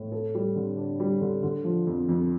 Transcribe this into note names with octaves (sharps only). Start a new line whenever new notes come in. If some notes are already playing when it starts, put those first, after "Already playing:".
Already playing: A2
A4
G3
D3
D4
G3
D3
D3
F3
F2
F2